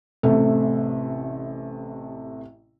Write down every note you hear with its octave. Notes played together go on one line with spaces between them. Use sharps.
A1 C3 A3